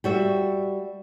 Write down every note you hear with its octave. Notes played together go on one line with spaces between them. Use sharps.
G3 F#4 E5